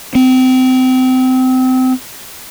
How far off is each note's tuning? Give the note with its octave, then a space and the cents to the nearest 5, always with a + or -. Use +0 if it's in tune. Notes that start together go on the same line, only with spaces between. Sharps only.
C4 -25